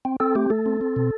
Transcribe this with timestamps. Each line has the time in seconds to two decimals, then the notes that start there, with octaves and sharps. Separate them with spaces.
0.05 C4
0.20 C4 A4
0.35 A3 G4
0.50 A3 A4
0.66 C4
0.81 C4
0.96 B2